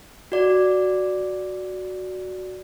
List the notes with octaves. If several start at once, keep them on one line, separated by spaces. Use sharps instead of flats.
F#4 D5